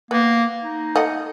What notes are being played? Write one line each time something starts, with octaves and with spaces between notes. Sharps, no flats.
A#3 B3
D#4
A3 D#5 F#5